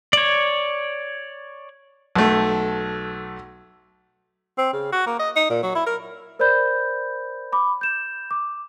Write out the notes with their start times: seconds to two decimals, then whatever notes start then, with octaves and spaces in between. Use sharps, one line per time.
0.13 C#5 D5
2.16 B1 A3
4.58 C4
4.73 C#3
4.92 F#4
5.07 A#3
5.19 D#5
5.36 D#4
5.50 A#2
5.63 F#3
5.75 E4
5.87 A#4
6.39 A#4 C5 D5 B5 G6
7.52 B5 D6
7.81 G6 E7
8.31 D6